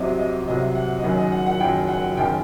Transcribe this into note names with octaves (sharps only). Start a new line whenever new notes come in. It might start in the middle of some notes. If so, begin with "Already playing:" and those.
Already playing: C2 C3 F#3 D#5
D#5
C2 C3 F#3 D#5
F#5
D#5
F#1 F#2 D#3 F#3 F#5
D#5
F#5
F#5
F#1 F#2 D#3 F#3 G5
F#5
F#1 F#2 D#3 G5